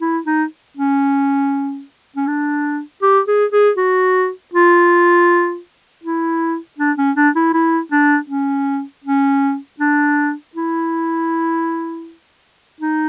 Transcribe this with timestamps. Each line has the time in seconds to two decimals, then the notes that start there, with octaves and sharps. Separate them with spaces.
0.01 E4
0.27 D#4
0.77 C#4
2.16 C#4
2.28 D4
3.02 G4
3.28 G#4
3.53 G#4
3.77 F#4
4.54 F4
6.04 E4
6.79 D4
6.98 C#4
7.16 D4
7.36 E4
7.54 E4
7.92 D4
8.30 C#4
9.04 C#4
9.80 D4
10.56 E4
12.81 D#4